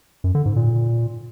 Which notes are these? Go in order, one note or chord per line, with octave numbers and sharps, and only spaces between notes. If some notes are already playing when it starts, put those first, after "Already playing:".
F#2
D3
G#2
A#2